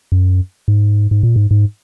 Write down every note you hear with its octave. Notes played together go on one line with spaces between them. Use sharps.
F#2
G#2
G#2
A#2
G#2
G#2